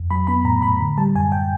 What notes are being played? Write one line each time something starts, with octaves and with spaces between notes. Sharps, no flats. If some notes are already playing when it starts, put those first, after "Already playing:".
Already playing: F2
F#3 B5
B3 B5
A2 A#5
A2 B5
D3
G3 A5
F#2 G#5
G5